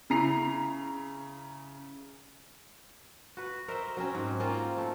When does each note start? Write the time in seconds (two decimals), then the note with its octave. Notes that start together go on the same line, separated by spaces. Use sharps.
0.10 C#3 E4 A#5 C7 F7
3.37 F#4 B4
3.68 A#4 C5 D#5 E5
3.97 F#3 C4 C#4
4.15 G#2
4.40 A#3 C4 C#4 F4
4.78 A3